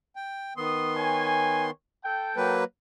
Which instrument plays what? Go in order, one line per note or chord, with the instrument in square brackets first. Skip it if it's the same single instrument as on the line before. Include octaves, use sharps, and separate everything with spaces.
[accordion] G5
[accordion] D#3 B3 C6 [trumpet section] D#6
[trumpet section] C#5 G#5
A4 G5
[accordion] F#3 A#3 B4